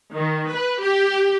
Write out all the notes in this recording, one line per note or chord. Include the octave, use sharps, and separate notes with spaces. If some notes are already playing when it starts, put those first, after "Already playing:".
D#3
B4
G4